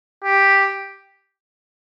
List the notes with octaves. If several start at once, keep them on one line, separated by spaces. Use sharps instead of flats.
G4